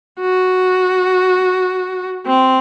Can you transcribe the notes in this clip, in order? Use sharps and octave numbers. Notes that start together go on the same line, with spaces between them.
F#4
C4